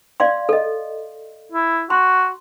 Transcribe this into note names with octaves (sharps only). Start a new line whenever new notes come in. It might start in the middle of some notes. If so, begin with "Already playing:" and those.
D5 F5 C6
A4 D#5
E4
F#4 C6